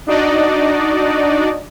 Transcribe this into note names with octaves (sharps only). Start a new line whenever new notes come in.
D4 D#4 F#4 D5 D#5